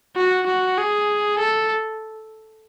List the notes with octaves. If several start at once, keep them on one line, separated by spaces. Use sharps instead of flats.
F#4
F#4
G#4
A4